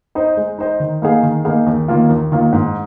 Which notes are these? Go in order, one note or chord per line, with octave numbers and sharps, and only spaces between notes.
D#4 C5 D#5
G#3
D#4 C5 D#5
D#3
A#3 D#4 G#4 F5
D#3
A#3 D#4 G#4 F5
D#2
D#3 A#3 F4
D#2
D#3 A#3 F4
G#2